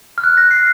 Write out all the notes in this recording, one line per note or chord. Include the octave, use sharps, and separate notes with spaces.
F6
F#6
A#6
C7